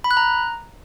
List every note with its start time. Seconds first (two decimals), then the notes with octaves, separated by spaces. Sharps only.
0.04 B5
0.11 F#6
0.17 A#5